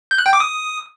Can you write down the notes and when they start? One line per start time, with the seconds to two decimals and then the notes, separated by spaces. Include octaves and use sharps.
0.11 G6
0.18 F#6
0.26 G5
0.33 D6
0.40 D#6